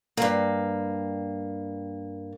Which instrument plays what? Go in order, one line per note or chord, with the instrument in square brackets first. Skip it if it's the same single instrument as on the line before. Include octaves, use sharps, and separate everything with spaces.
[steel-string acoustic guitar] G2 A#3